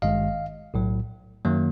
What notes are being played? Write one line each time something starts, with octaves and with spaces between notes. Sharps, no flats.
G#1 G2 D#3 G#3 D#5 F5
B1 A2 F#3
F#2 D#3 F#3 A#3